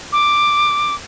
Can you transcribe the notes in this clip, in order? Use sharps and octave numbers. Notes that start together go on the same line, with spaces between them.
D6